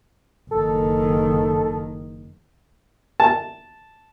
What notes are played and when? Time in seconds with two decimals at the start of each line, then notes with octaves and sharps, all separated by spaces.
0.51 F#1 D#3 A4
3.20 A5